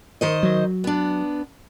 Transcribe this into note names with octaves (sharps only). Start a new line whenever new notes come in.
D#3 C5 D#5
F#3
B3 D4